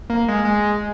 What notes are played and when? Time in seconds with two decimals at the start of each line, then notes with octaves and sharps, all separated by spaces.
0.10 A#3
0.28 G#3
0.45 G#3